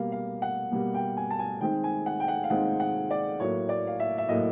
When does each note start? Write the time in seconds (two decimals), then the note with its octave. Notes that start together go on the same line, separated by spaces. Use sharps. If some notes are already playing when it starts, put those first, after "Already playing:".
Already playing: B2 G3 A#3 F5
0.12 F5
0.42 F#5
0.71 B2 G3 A#3
0.94 G5
1.17 G#5
1.30 A5
1.39 G#5
1.61 D#3 G#3 C4 D#4 G5
1.84 G#5
2.06 F#5
2.20 G5
2.28 F#5
2.44 F5
2.50 D#3 G#3 C4 D#4 F#5
2.80 F#5
3.11 D5
3.39 A2 F#3 A#3 C#5
3.69 D5
3.87 F5
4.00 E5
4.18 E5
4.29 A2 F#3 A#3 D#5